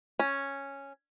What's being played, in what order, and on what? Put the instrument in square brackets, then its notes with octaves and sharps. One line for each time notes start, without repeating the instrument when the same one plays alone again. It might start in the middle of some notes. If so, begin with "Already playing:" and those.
[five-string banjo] C#4